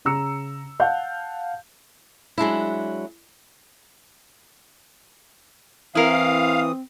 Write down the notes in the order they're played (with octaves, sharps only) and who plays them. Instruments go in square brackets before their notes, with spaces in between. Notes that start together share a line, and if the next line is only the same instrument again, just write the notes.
[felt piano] C#3 A#5 E6 C#7
F5 F#5 A5 G6
[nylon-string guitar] F#3 G#3 D4 E4
[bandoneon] E3 D#6 [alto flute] C4 [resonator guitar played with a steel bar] E4 A#4 [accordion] F5